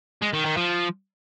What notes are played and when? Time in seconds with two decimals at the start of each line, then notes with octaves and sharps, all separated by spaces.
0.22 G#3
0.33 D#3
0.45 D#3
0.57 F3